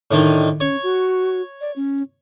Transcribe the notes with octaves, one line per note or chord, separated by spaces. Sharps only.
A2 D3 D#3
C#4 C#5
F#4
D5
C#4